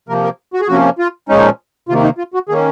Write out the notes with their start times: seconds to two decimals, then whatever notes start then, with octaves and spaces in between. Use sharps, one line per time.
0.09 C3 F3 A#3 A#4
0.24 A#4
0.54 F#4
0.61 G#4
0.68 C3 F3 A#3 C#4 F#4
0.99 F4
1.29 A#2 F3 G#3 C#4 D#4
1.89 C3 D#3 A#3 F4
2.03 D#4
2.18 F4
2.34 F#4
2.49 D#3 A#3 C#4 G#4